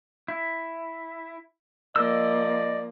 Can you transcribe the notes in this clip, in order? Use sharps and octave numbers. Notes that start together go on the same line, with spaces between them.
E4
F3 A#3 D5 D#5 E6